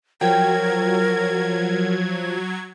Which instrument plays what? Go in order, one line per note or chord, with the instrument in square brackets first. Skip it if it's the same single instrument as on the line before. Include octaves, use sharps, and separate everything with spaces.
[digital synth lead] F3 [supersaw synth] F#3 G#6 [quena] A#4 [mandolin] G5